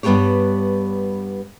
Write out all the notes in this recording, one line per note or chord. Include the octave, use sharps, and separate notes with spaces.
G2 G3 B3 C4 G4 C#5